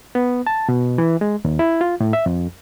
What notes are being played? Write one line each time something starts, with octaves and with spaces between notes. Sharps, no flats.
B3
A5
B2
E3
G#3
D#2
E4
F4
A2
E5
F2